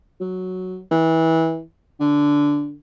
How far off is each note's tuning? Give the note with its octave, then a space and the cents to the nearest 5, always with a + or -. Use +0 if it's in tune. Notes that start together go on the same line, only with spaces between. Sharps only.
F#3 +0
E3 -25
D3 -10